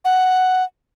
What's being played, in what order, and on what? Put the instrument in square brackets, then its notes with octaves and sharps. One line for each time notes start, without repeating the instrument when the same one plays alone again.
[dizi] F#5